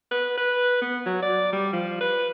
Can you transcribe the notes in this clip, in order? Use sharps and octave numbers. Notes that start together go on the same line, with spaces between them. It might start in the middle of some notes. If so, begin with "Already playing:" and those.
B4
B4
B3
F#3
D5
G3
F3
B4